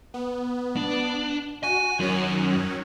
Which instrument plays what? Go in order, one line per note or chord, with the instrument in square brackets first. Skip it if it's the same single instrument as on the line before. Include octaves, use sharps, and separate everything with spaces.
[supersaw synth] B3
[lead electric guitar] D4
[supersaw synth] F#4 [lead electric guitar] G#5
[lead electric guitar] F#2 [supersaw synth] D#3 F#3 C#4